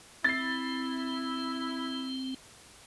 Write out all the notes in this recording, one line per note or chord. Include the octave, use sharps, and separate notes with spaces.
C4 E4 A6 C7